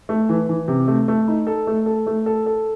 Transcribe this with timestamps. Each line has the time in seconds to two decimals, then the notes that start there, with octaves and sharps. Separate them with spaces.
0.09 A3
0.29 E3
0.49 E3
0.68 C3
0.88 A3
1.08 A3
1.28 D#4
1.47 A4
1.67 A3
1.86 A4
2.07 A3
2.26 A4
2.46 A4